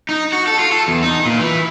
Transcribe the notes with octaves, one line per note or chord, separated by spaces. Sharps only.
D#4
F#4
A4
F4
A4
E2
D#4
A#2
E3